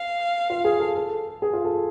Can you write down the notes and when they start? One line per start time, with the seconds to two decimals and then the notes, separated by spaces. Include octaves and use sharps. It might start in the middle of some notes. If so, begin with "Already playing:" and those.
Already playing: F5
0.50 F4
0.65 G#4
0.80 A4
0.95 A4
1.42 G#4
1.53 F4
1.65 A4